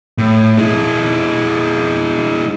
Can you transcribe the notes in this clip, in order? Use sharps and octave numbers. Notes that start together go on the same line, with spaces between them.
A2
G#3 E4